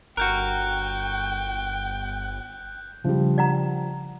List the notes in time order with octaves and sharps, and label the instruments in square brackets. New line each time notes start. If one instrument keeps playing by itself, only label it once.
[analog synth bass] G1 [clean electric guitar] F#4 A#4 [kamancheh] G5 [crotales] F#6 G6
[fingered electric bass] C#3 D4 [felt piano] F3 G3
[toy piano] D5 F#5 A#5